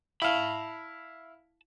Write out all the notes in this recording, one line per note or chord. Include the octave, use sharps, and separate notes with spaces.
E4 F5 A5 B5